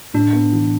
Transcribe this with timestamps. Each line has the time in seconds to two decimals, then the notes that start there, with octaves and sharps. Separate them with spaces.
0.14 A2 D4
0.33 B3
0.52 E3